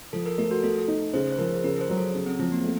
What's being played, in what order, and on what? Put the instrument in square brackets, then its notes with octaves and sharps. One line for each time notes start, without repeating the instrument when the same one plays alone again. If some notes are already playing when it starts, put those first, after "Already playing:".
[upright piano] F3 [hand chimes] A4
[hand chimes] A#4
[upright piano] A3 [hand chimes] A#4
[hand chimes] F#4
[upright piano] A3 [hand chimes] A4
[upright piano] D#4
[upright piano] C#3 [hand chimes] C5
[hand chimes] C5
[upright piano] F3 [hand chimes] A#4
[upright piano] C#3 [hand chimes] A#4
[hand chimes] C5
[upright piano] F#3
[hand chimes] A4
[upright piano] C#3
[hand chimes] C4
[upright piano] F3 [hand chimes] C4
[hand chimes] A#3
[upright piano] A3